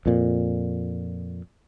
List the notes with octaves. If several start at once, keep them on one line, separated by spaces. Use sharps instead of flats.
F2 A#2